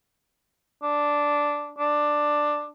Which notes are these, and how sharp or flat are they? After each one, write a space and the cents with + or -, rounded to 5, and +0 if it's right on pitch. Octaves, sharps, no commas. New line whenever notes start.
D4 -5
D4 +10